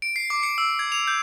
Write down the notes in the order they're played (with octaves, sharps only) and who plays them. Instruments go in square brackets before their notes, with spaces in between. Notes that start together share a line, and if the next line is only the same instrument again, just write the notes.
[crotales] D7
C7
D6
C#7
E6
G#6
F7
G6